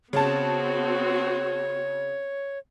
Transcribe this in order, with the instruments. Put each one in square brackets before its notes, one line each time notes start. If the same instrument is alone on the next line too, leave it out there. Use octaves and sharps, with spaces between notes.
[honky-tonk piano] C#3 A5 [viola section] B3 C4 F#4 [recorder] C#5